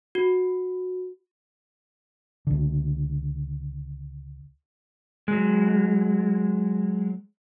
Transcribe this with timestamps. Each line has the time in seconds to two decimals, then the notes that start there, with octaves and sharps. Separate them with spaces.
0.15 F#4
2.47 C#2 D3
5.28 F#3 G#3